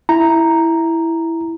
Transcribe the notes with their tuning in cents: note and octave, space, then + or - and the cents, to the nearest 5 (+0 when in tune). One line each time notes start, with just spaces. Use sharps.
E4 +0 A#5 +0